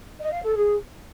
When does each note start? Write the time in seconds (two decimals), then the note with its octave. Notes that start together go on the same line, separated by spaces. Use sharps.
0.20 D#5
0.31 F5
0.43 A4
0.55 G#4